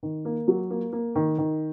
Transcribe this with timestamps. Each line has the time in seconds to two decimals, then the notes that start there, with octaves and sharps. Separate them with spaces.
0.03 D#3
0.25 A#3
0.48 F#3
0.70 A#3
0.93 A#3
1.15 D#3
1.38 D#3